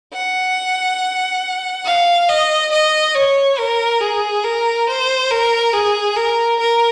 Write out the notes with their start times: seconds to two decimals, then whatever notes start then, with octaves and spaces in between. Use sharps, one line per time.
0.13 F#5
1.85 F5
2.28 D#5
2.72 D#5
3.15 C#5
3.58 A#4
4.01 G#4
4.44 A#4
4.87 C5
5.30 A#4
5.73 G#4
6.17 A#4
6.59 A#4